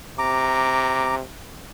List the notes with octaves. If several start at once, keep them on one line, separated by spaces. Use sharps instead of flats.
C3 A#5 D6